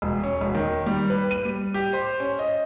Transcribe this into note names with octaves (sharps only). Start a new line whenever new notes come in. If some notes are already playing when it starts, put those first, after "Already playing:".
E1
C#4
E1
D#3
G3
B4
D#7
G3
G4
C5
C#4
D#5